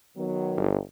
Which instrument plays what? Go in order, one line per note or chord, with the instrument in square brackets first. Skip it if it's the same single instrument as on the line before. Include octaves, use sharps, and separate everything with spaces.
[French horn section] D#3 F#3 B3
[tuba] G1